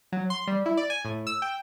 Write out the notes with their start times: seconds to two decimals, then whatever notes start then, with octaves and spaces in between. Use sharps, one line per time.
0.12 F#3
0.30 C6
0.47 G3
0.66 E4
0.77 D5
0.90 G#5
1.05 A2
1.27 E6
1.42 G5